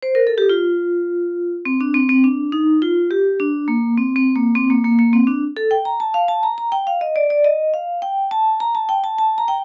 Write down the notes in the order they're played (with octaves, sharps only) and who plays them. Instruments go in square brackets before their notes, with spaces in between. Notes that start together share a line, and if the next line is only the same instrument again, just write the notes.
[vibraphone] C5
A#4
A4
G4
F4
C4
D4
C4
C4
D4
D#4
F4
G4
D4
A#3
C4
C4
A#3
C4
A#3
A#3
A#3
C4
D4
A4
G5
A#5
A5
F5
A5
A#5
A#5
G5
F5
D#5
D5
D5
D#5
F5
G5
A5
A#5
A5
G5
A5
A5
A#5
G5